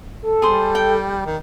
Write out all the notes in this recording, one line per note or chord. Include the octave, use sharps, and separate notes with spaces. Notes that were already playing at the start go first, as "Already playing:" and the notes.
A4
G3 G#4 C5
G5
D#3